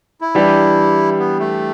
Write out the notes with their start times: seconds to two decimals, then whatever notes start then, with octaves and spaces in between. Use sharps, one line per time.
0.21 E4
0.35 E3 G3 D4 G4
1.19 B3
1.40 A3